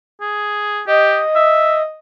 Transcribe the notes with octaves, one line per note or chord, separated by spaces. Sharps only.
G#4
G4 D#5
E5